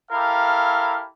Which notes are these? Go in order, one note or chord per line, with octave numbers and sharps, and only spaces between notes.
E4 G4 A4 A#4 F5